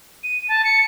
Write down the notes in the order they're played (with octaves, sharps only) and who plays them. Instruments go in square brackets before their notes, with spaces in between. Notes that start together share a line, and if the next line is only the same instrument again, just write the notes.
[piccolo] D#7
A5
C#7